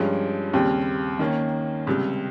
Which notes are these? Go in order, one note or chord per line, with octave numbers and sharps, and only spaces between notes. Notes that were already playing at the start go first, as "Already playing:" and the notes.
Already playing: G2 F3 G#3 C#4 G4
D#2 C#3 G3 C4
D#3 A#3 C#4
C#2 C3 G3